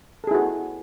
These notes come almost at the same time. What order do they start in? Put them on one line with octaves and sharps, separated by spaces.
A4 G#4 E4 F#4